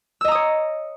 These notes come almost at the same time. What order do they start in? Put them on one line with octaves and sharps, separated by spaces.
E6 D#5 A#5 D#6 C#5